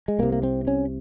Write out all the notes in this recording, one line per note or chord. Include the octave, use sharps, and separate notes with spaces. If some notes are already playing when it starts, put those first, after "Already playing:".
G#3
C2 C3 A#3
A#3
C4
C#4